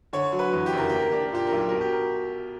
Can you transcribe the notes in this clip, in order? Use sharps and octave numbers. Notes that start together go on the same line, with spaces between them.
D3 C#5
F#3
B4
E2
G4
F#1 A#4
A#3 G4
A#4
D4 G4
A#4
A#2 G4
B1 A#4
G4
B2 A#4
G4
A#4